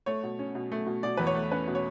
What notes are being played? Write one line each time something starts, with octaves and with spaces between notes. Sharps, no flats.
A3 C#5
B2
C#4
B2
A3
B2
B2 D5
E2 B4
C#5
A3
C#4 B4
B2
C#5